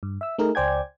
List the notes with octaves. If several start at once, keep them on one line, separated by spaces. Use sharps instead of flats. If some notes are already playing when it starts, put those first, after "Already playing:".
G2
E5 E6
A3 D#4 G#4 A#4
C#2 C5 D5 G5 G#5 G#6